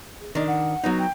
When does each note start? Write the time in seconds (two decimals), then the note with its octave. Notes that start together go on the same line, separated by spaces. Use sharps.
0.20 G#4
0.35 D#3 D4 D#5
0.48 F#5
0.84 F#3 B3 D#4
0.99 G5